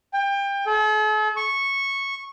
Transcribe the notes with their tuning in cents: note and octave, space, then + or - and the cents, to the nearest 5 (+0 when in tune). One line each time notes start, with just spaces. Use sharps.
G5 +25
A4 -45
C#6 -10